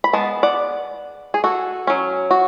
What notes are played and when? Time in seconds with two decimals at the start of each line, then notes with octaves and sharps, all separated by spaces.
0.04 B5
0.13 G#3 B3 A5
0.43 D5 F#5
1.34 G#4
1.44 F#4 A4
1.87 F#3 C#4
2.31 F#4